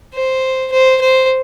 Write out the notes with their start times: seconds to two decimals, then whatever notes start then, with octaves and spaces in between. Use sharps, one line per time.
0.14 C5
0.72 C5
1.01 C5